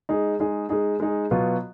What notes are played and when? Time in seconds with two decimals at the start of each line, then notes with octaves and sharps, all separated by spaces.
0.09 G#3 D#4 G#4
0.40 G#3 D#4 G#4
0.69 G#3 D#4 G#4
1.00 G#3 D#4 G#4
1.31 B2 F#3 B3 F4